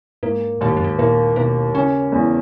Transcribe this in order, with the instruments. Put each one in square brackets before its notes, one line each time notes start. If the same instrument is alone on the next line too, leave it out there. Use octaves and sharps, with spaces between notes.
[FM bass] G#2 [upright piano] A#3
[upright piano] D#2 [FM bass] A#2
[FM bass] G#2
F#2
G#2
[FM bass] A#2 [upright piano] A#3
[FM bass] B2 [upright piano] A#3
[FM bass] C#3 [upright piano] C#4
[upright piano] E2